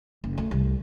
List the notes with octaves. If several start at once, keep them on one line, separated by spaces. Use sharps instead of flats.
F#1
D2
C2